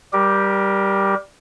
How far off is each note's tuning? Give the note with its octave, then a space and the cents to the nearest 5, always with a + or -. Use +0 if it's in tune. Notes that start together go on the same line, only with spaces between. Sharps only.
G3 +0 G4 +0 A#4 +25